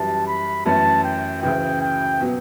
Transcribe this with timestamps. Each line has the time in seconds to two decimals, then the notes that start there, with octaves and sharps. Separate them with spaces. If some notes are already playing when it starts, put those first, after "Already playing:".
Already playing: F#2 E3 G3 A5
0.27 B5
0.66 F#2 E3 A3 C#4 A5
1.04 G5
1.43 D2 C#3 E3 G5
1.81 G5
2.21 B2 F#3 B3